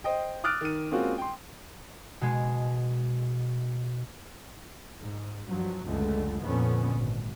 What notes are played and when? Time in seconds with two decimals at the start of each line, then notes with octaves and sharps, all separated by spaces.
0.04 C5 D#5 G5
0.44 D6 D#6 F6 F#6 A6 D7
0.61 D#3 D#7
0.91 G#3 A#3 C4 C#4 F4 F#4
1.18 G5 C6
2.21 B2 G#3
5.01 G#2
5.48 G2 F3 F#3
5.86 C#2 F#2 D3 G#3 A3
6.42 F2 A#2 D3 B3 C#4
6.97 G#1